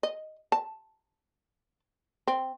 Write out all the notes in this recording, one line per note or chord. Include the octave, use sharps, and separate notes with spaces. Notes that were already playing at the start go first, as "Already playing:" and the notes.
D#5
A5
C4